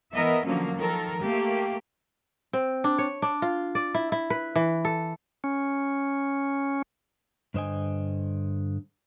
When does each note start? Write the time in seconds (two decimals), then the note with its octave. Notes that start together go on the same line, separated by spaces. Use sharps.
0.14 E3 B3 A#4 D#5 E5
0.46 D3 F3 F#3 A#3 C#4
0.77 D#3 F3 A4 A#4
1.21 A3 A#3 G4
2.53 C4
2.84 D4
2.98 C#5
3.22 D4
3.42 F4
3.75 D5
3.95 E4
4.12 E4
4.30 B4
4.56 E3
4.85 A4
5.44 C#4
7.54 G2 D3 C5 D#5 G5 G#5